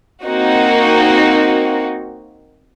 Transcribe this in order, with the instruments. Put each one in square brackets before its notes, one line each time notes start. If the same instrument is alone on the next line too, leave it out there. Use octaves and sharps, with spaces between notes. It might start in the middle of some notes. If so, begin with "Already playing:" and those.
[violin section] A#3 C4 D#4 F#4